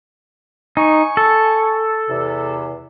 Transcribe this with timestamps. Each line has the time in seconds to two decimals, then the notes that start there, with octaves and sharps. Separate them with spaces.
0.77 D#4 G#5 C#6
1.17 A4
2.10 E2 C3